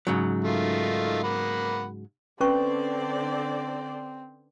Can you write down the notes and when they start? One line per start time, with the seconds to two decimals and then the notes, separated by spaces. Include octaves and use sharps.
0.07 G#2 C#3 F#3
0.45 D#3 A3 F4
1.23 A#3 F#5 B5
2.41 D3 C4 C#4 B4 C5 D5 C#6